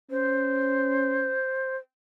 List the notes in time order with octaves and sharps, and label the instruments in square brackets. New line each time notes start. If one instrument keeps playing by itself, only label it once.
[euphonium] C#4 [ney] C5